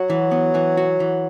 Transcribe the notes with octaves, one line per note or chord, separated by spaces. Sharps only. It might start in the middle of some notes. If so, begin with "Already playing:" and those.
Already playing: F#3 F#4
E3
B3
E3
F#4
E3